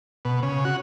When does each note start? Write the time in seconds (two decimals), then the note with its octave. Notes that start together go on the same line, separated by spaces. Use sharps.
0.25 B2
0.43 C#3
0.65 F#4